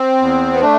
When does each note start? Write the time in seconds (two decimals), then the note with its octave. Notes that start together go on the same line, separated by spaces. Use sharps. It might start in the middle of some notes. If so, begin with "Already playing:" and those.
Already playing: C4
0.21 E2
0.53 B3
0.61 A3 D4